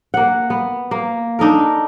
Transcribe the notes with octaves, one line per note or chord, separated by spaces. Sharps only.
A#3 F#5
B3
A#3
D4 D#4 A4 A#4